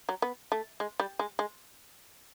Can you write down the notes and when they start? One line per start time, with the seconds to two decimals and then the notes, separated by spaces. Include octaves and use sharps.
0.09 F#3
0.22 B3
0.52 A3
0.80 G#3
1.00 G3
1.19 G#3
1.39 G#3